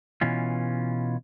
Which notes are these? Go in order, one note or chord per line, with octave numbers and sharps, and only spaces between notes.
B2 E3 C#4 F4